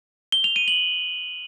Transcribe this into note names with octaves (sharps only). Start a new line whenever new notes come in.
G7
F7
D#7
F#7